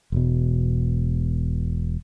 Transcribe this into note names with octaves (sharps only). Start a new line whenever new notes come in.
E1 B2